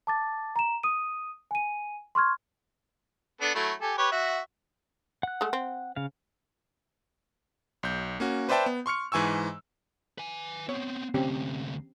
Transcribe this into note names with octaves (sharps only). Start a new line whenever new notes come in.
A5 D6 A6
A#5 E7
D#6 D#7
G#5 D#7
C6 C#6 F6 G#6
B3 D4 A4
F#3 A3 E4
G4 A4 G#5
G4 B4 C#5
F#4 E5 F#5
F#5 F#6
G#3 A3
C4
C#3 F5
B1 G6
A#3 C#4 F#4
B4 C5 D5 E5 G5 A5
B3
C6 C#6 F6 C#7
G#2 E3 G#5 C#6 E6
B4 G#5
B3 C4 C#5
D2 C3 C4 C#4 G4